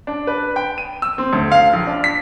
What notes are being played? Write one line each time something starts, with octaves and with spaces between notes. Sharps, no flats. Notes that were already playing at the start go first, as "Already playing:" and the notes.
D4
B4
G5
D#7
E6
C4
D2
F5
A#1
D4
B6